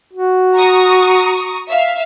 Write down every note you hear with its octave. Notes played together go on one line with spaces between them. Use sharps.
F#4
A#5 C#6 D#6
E5 F5